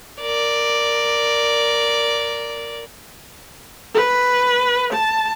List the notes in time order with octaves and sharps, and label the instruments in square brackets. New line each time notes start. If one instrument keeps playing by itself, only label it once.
[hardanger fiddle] A#4 D5
[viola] B4
A5